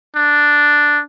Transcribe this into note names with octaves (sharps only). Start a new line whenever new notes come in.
D4